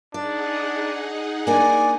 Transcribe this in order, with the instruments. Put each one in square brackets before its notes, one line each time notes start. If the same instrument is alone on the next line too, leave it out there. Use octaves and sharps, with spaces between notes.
[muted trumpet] D4 [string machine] D#4 G#4 F#5 [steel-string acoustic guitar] D5
[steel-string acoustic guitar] A#3 D4 [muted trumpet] D5 [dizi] G#5